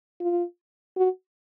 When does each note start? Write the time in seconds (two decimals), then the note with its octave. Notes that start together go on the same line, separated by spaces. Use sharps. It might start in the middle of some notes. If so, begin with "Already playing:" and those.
0.20 F4
0.96 F#4